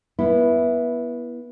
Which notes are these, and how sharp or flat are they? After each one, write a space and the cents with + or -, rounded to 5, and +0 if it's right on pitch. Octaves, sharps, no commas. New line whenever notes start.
B3 -25 E4 +0